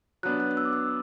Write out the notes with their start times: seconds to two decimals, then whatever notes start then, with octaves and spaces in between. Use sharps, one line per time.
0.23 F#3 B3 D4 F#6
0.40 F#6
0.51 F#6
0.57 E6
0.65 D6
0.73 E6